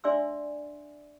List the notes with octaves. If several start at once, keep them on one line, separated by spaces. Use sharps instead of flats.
D4 D5 E5 G#5 C6 E6